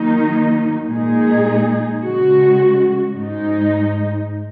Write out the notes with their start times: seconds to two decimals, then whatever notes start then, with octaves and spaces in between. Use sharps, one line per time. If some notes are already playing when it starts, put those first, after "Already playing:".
Already playing: D#3 F#3 A#3 D#4
0.89 A#2 G#3 D#4 G#4
2.02 C#3 G#3 F#4
3.16 G#2 G#3 D#4